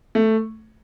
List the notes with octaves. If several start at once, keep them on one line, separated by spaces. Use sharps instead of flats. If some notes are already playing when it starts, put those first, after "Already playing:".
A3